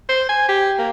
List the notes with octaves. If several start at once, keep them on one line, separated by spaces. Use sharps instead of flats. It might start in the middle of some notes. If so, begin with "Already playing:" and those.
C5
G#5
G4
A#3